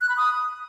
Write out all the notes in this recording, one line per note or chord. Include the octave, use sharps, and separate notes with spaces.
F#6
B5
D#6